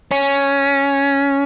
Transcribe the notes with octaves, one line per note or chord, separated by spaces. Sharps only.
C#4